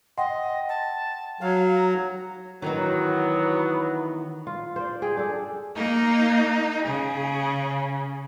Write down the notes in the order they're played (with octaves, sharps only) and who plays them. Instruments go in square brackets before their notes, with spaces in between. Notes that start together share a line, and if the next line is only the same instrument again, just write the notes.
[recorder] D#5 [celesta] F#5 G5 C6
[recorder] A5
[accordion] F#3 [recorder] F5
[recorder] A#5
[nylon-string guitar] D#3 E3 D#4 [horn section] F#3 [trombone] B3
[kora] F4
C5 D5
G#4 G5
D4 G#4 A4
[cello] A#3 [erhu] D#4
[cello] C#3 [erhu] G#4